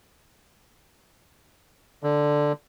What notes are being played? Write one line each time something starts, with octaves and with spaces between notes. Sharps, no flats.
D3